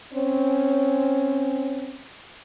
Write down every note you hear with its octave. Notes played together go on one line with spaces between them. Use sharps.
C4 C#4